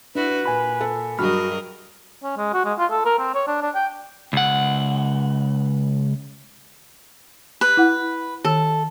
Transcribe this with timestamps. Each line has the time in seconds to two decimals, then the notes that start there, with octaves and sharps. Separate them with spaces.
0.15 D4 E4 F#4 B4
0.46 A#2 G#5 B5
0.81 A4
1.19 G2 F#3 F#4 G#4 A#4 D#5 B5 F6
2.23 C#4
2.37 G#3
2.53 F#4
2.65 G#3
2.78 F4
2.91 A4
3.05 A#4
3.19 C4
3.35 C#5
3.47 D4
3.62 D4
3.75 G5
4.33 C#2 F#5
7.61 B4
7.77 E4 F#5
8.45 D#3 A4